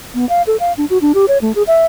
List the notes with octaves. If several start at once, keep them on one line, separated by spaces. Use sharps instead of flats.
B3
F5
A4
F5
D4
F#4
D4
G4
C#5
A3
G#4
E5